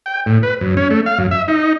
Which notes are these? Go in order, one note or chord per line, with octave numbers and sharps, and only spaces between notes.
G5
A2
B4
F#2
C#4
A3
F5
F#2
E5
D#4